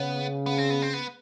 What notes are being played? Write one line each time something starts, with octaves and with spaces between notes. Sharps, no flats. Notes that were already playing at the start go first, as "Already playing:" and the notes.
Already playing: C#3 B3
B3
C4
B3
C4
B3